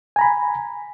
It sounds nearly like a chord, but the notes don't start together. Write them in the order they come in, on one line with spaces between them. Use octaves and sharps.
G#5 A#5 B5